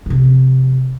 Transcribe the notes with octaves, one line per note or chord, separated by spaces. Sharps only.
C3 F3